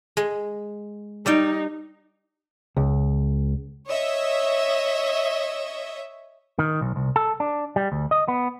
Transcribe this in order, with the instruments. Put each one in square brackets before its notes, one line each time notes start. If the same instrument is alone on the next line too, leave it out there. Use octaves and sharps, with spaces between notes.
[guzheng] G#3
[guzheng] G3 D5 G5 [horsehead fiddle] D#4
[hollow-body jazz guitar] C#2
[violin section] C#5 D#5 E5
[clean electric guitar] D#3
B1
C2
A4
D4
G3
D2
D#5
B3